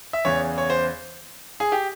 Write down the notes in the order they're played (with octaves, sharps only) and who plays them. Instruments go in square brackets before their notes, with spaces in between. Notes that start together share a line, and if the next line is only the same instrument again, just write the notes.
[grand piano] E5
E2 C#3 E3 C#5
C#5
C5
G#4
G4